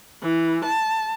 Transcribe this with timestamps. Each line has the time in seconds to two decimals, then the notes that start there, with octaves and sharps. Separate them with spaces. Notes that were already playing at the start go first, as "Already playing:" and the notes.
0.22 E3
0.64 A5